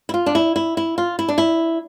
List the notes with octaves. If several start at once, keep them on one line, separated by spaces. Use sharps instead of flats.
E4
F4
D4
E4
E4
E4
F4
E4
D4
E4